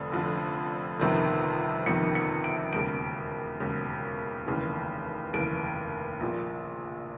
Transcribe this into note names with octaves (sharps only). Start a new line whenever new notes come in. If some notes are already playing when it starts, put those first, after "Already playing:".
Already playing: F1 F2 D3
F1 F2 D3
G1 F2 C3 D#3
G1 F2 C3 D#3 C#7
C#7
D7
E1 D#2 C#3 D7
E1 D#2 C#3
F1 D#2 C#3 E3
F1 D#2 C#3 E3 D7
A#1 A#2